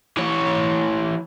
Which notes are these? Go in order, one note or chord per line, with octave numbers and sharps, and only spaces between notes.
E3 C#5